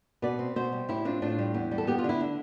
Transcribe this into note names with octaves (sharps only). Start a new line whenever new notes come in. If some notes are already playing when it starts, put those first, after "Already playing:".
B2 B4 D5
C4
B2 C5 E5
G3
A2 E4 G4
C4 D4 F4
A2 D4 F4
G3
E2 E4
G3
A4
B3 G4
F4
D3 E4
D4